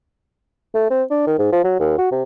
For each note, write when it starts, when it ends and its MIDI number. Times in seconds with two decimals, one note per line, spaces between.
0.75 0.85 57
0.90 1.03 60
1.10 1.26 62
1.27 1.35 51
1.39 1.51 44
1.52 1.62 53
1.64 1.78 54
1.79 1.94 39
1.98 2.08 66
2.12 2.23 48